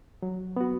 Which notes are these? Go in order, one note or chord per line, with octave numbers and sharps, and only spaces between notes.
F#3
B3 F#4